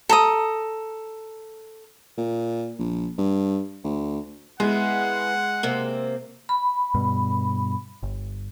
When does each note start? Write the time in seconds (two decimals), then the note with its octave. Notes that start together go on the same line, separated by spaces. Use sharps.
0.09 A4 A#5 D#6
2.18 A#2
2.79 A#1
3.18 G2
3.84 D2
4.60 G#3 B3 E4 F#5
5.63 C3 A#3 C4
6.49 B5
6.95 G2 B2
8.03 G1